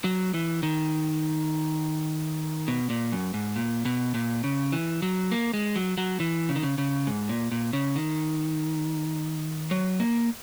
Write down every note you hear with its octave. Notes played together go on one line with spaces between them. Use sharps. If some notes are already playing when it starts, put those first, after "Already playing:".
F#3
E3
D#3
B2
A#2
F#2
G#2
A#2
B2
A#2
C#3
E3
F#3
A#3
G#3
F#3
F#3
E3
C#3
D#3
C#3
C#3
G#2
A#2
A#2
C#3
D#3
F#3
A#3